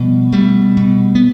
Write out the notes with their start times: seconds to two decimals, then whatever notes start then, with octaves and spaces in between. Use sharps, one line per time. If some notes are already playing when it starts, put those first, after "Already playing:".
Already playing: B2 F3 G3
0.32 B2 G3 A3
0.77 B2
1.15 B3